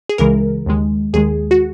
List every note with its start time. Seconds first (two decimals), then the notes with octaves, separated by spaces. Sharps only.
0.09 G#4
0.18 C#2 C#3 E3 G#3 A#4
0.66 D#2 D#3 G#3
1.14 D#2 D#3 G#3 G#4
1.51 F#4